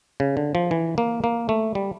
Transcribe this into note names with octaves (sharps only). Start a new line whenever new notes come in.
C#3
D3
F3
E3
A#3
A#3
A3
G3